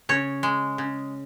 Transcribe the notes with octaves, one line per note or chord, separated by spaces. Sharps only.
C#3 C#5
G#3
C#3